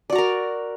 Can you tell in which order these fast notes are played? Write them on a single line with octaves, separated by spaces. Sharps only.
D5 F#4 A#5 A#4